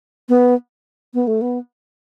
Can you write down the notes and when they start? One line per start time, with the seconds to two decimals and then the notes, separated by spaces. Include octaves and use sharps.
0.29 B3
1.14 B3
1.27 A3
1.41 B3